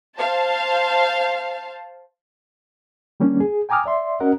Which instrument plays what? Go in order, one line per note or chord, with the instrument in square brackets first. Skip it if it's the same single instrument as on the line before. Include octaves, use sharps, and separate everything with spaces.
[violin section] C5 F5 A5
[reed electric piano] D#3 G3 A#3 C#4 D4
G#4
G5 G#5 A#5 D6 D#6 F6
D5 E5 C6
C#4 F#4 A#4 D#5 F#5